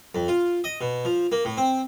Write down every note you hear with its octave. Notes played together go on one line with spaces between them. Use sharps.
F2
F4
D#5
B2
F3
A#3
A2
C4